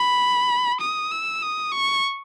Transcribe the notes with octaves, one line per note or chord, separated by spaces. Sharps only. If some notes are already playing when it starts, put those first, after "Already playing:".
Already playing: B5
D#6
E6
D#6
C#6